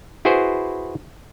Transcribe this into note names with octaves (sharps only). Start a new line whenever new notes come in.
E4 F#4 G#4 B4 C5